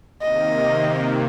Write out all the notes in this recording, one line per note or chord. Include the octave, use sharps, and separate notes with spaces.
C3 D#3 A#3 D#5